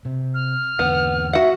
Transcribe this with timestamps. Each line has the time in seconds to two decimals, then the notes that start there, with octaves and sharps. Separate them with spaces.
0.05 C3
0.34 F6
0.79 E2 D3 B3 F#5
1.33 F#4 E5 F#5